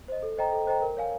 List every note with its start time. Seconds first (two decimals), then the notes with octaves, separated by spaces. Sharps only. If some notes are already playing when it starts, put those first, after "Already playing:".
0.08 C5 D#5
0.23 A4
0.37 C5 D#5 G5 A#5
0.52 A4
0.67 C5 D#5 G5 A#5
0.82 A#4
0.97 C#5 F5 G#5